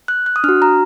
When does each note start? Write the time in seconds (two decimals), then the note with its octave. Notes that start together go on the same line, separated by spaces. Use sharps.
0.08 F#6
0.26 F#6
0.36 D#6
0.44 D4 F#4 F6
0.62 A#5